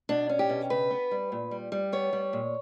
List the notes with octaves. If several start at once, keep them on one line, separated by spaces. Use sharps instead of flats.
B2 D4
C#4
G4
B2
C#3 B4
B3
G3
A#2
G3
G3
B3 C#5
G3
A#2